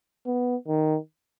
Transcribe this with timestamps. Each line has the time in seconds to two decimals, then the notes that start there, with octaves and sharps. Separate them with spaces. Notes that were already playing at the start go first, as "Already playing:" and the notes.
0.26 B3
0.67 D#3